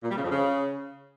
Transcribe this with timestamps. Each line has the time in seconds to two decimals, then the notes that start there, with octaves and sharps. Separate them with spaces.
0.03 A#2
0.10 G3
0.16 C#3
0.23 F2
0.30 C#3